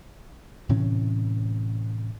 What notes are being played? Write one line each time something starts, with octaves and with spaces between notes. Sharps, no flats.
A2 C3 E3 C#4